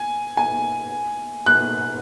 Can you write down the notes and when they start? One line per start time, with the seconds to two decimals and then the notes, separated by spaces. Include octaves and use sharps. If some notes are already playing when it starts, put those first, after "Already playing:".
Already playing: G#5
0.37 G#5
1.46 F#6